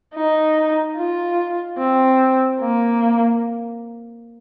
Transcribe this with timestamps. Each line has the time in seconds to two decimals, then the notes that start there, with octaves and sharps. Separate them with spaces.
0.15 D#4
0.97 F4
1.78 C4
2.61 A#3